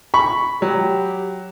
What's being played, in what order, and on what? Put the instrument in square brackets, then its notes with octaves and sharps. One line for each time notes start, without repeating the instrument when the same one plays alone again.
[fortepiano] B5 [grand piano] C#6
[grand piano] F#3 [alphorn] G4